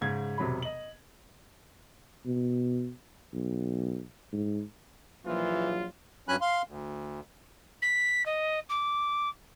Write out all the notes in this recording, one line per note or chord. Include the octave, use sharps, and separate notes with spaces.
G#2 C#3 G#6
E1 C3 F#3 B5
D#5 F#7
B2
B1
G#2
A#1 E3 F#3 F4
G2 F#3 C#4 G#5 B5 F#6
F5 C6
D2
B6
D#5
D6